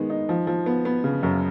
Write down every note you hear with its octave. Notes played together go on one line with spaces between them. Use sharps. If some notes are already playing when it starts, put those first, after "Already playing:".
Already playing: D#3 G#3 B3
D#4
F3
F3
B3
B3
C#3
F#2